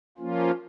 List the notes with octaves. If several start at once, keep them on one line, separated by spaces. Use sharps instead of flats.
F3 A#3 C#4 F4